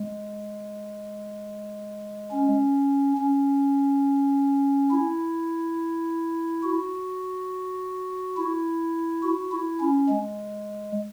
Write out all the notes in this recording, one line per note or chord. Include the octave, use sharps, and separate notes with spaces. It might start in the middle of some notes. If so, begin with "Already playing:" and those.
Already playing: G#3
C#4
C#4
E4
F#4
E4
F#4
E4
C#4
G#3